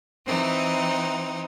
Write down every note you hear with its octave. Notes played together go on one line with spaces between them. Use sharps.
E3 C4 D#4